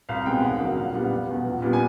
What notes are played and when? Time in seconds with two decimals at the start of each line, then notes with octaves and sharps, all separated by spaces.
0.09 C2 F5
0.26 B2 G#3 C4 G5
0.43 D#2 F#5
0.60 D3 F#3 A#3 F5
0.77 A#1 F5
0.94 A#2 G3 B3 F#5
1.11 F1
1.28 E2 B2
1.45 A#1
1.62 A#2 G3 B3
1.73 G#5